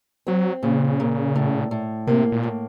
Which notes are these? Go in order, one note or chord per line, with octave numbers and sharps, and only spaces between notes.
F#3 C4
A#2 C#3
A#2
A2
A2
C3 A#3
A#2
A2